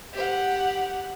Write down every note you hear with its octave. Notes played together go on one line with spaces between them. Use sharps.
G4 F#5